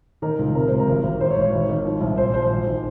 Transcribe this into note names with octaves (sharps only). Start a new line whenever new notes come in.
D#3 A#4
C#2
C3 A#4
C#2 C5
A#4
G#1
G#1
G#1 C5
C#5
G#1
C#5
G#1
D#3
F3
C2
A#1 C5
F3 C5
G#1
D#3